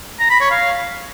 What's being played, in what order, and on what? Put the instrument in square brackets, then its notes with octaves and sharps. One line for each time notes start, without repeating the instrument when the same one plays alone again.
[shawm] A#5
B5
C#5
F5